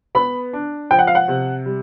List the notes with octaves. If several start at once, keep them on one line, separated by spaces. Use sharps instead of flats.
B3 B5
D4
F3 G5
F#5
F5
F#5
C3
G3